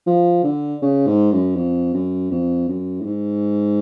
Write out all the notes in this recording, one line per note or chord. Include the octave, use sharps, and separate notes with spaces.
F3
D3
C#3
G#2
F#2
F2
F#2
F2
F#2
A2
G#2